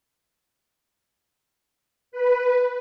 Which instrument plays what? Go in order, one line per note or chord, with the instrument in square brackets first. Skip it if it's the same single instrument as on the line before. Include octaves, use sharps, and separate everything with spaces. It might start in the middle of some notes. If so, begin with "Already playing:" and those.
[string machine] B4